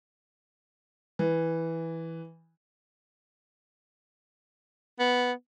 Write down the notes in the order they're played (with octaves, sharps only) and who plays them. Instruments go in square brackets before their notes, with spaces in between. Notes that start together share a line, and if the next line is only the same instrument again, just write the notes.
[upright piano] E3
[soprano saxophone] B3